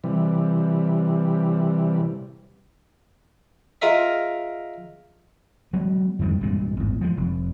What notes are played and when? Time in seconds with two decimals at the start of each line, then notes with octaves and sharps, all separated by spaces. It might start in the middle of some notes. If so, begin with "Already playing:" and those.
0.04 C3 E3 G3
3.82 F4 G#4 A#4 D#5 E5
5.73 F#3 G#3 B3
6.19 F2 D#3 G3 G#3
6.41 C2 G2 A#2 G#3
6.77 G#1 E2
7.01 F3 G#3
7.17 F1